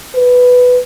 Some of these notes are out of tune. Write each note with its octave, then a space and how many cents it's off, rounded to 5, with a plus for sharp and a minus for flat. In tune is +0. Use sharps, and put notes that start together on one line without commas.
B4 +5